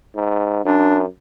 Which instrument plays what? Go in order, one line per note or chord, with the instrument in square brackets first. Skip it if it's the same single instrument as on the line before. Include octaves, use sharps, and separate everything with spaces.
[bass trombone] G#2
[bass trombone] F#2 [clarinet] D4